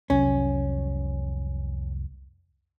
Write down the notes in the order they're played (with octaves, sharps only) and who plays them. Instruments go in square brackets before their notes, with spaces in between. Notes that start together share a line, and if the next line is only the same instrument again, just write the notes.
[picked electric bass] F1 C2 F#3 [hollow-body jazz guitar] C#4